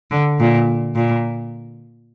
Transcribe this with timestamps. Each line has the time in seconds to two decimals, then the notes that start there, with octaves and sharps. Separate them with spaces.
0.11 D3
0.39 A#2
0.96 A#2